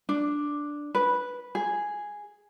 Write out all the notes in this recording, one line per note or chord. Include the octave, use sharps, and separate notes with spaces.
D4
B4
G#4